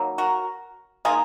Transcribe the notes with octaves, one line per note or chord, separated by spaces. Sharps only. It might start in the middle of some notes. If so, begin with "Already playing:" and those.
Already playing: D#3 F#3 A#3
F#4 A#4
D#3 A#3 F4 G#4